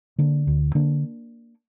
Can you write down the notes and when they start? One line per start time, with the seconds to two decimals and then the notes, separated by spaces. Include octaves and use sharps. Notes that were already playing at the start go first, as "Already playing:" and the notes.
0.18 D3 A#3 D4
0.47 D2
0.75 D3 A#3 D4